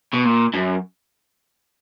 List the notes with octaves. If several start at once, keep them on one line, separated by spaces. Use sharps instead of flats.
B2
A#2
F#2